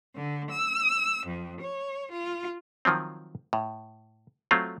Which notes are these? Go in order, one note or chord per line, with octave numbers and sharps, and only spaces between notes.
D3
E6
F2
C#5
F4
D#3 F3 F#3 C4
A2
F#3 A3 C4 F4